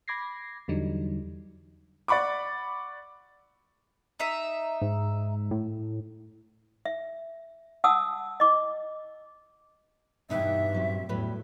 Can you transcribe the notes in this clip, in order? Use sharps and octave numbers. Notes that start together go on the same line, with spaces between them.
B5 D6 G#6 A#6 C7
E2 D3 E3 F#3 G3 D#4
D5 F#5 B5 C#6 D6
D#4 E5
G#2
A2
E5
F#5 A5 D#6 E6
D#5 D6
E2 G2 B2 E3 D#4 E5 F#5 G5
A#2 F#3 C4
E2 A2 F#3 G3 B4